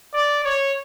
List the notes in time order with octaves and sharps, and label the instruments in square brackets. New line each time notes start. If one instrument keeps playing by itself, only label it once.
[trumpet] D5
C#5